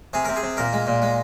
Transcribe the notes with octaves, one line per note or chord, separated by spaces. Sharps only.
C3 G#4
C3 A#4
G#4
C3
A#2 A#4
G#3
A#2
G#3